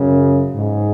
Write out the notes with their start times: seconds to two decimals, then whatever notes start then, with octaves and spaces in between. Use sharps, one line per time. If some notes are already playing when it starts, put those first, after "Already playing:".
Already playing: F#2 C#3
0.55 G#2